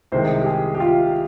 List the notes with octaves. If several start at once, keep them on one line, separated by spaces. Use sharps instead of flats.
C2 C3 D#3 G#3 C5
G4
G#4
G4
F4